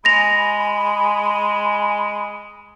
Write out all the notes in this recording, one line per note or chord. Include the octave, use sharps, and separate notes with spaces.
G#3 G#5 B5 A#6 F7